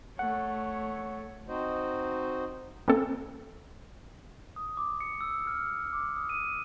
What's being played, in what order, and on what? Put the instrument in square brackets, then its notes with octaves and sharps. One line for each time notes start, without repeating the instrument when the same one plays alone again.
[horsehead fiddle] A3 C#5 [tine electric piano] F#5
[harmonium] C4 D#4 F#4 C5 D#5
[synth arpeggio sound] A#3 C4 C#4 A4
[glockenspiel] D#6
D6
C#7
E6
F6
D6
D#6
D#7